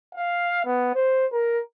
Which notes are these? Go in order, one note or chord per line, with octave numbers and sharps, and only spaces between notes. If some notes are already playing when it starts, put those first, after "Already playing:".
F5
B3
C5
A#4